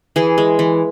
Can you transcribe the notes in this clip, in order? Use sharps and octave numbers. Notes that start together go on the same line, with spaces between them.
E3 G#4
G#3
E3